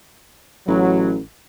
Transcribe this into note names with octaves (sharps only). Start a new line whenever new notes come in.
A1 F#3